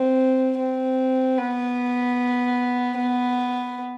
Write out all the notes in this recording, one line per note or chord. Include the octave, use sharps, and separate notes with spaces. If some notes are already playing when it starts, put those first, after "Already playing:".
Already playing: C4
C4
B3
B3